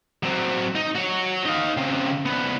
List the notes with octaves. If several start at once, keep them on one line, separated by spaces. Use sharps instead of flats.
F#3 C4
D#4
F#4 C#5
D#4 F5
C#3 C4
C2 B3